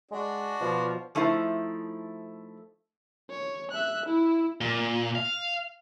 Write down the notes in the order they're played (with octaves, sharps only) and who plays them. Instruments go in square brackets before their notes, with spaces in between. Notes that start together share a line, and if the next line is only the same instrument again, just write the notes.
[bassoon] G#3 [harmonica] D4 F#4
[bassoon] B2 [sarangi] F3
[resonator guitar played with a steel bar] F3 A3 D#4 E4 B4 C5
[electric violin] C#5
E5 F#6
E4
[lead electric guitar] A#2
F5